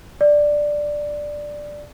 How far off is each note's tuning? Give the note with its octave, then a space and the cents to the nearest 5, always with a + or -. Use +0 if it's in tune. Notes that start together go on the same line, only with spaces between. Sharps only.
D5 +5